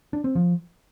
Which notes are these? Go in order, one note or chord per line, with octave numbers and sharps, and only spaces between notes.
D4
C4
F3